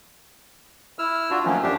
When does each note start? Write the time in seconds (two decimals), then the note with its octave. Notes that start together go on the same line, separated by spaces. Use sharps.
0.99 E4 E6 F6
1.30 D4 F4 F#4
1.45 D#3 F3 F#3 A3 A#3 C#4
1.63 F#2 D4 G4